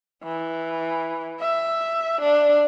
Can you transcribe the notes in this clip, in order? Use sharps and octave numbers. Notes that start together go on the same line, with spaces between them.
E3
E5
D4